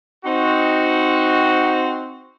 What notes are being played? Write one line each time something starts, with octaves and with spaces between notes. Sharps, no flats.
C4 D#4 F#4